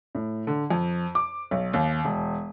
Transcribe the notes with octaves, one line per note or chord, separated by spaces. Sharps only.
A2
D3
F2
D6
B1
D#2
E1